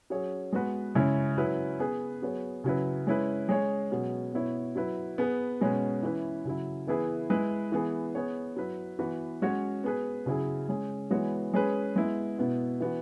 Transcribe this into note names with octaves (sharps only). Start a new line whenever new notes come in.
F#3 C#4 G#4 C#5
G#3 B3 F#4 B4
C#3 G#3 E4 C#5
F#3 C#4 E4 B4
B3 G#4 B4
F#3 B3 G#4 C#5
C#3 F#3 E4 B4
G#3 C#4 E4 B4
G#3 C#4 G#4 C#5
B2 F#3 C#4 G#4
B2 B3 E4 C#5
F#3 E4 B4
B3 G#4 B4
B2 G#3 C#4 G#4 B4
E3 C#4 E4 B4
C#3 F#3 E4
E3 B3 E4 G#4 B4
G#3 E4 B4
E3 B3 G#4
B3 G#4 C#5
F#3 E4 B4
E3 B3 F#4 B4
G#3 C#4 F#4 C#5
B3 G#4 B4
C#3 F#3 E4 G#4
G#3 C#4 G#4
E3 G#3 B3 F#4 C#5
G#3 C#4 G#4 B4
G#3 B3 E4
B2 B3 E4
E3 B3 F#4